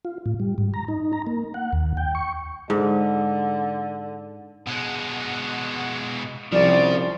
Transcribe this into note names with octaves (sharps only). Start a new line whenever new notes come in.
F4
A2
G3
G#2
A#5
D#4
A#5
A#3
F#5
D#2
G5
C#6
G#2 D3
B2 G#3 F#5
C2 C#3 F3 D5